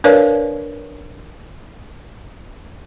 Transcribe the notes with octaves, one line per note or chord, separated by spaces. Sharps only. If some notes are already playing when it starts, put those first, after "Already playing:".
D4 A#4 B4 C#5 D5 F5